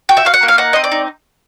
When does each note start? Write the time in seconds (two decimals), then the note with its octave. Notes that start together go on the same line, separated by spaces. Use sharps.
0.09 F#4 G5
0.17 E5
0.25 F#4 F5
0.34 F#5
0.43 A#3
0.48 F5
0.58 D#4 F#5
0.73 C4 D#5
0.84 D5
0.92 D#4